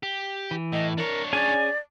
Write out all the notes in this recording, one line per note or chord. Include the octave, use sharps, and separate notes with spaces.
G4
E3
A2 D#5
D4 A#4 C#5
C#4 G#4 D5 G#5